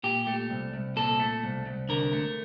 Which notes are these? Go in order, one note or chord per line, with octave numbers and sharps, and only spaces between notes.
A#2 G4
A3
C2
C2
A#2 A4
A3
C2
C2
D3 A#4
A3